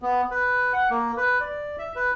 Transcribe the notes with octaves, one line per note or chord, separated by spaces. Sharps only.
B3
B4
F#5
A#3
B4
D5
E5
B4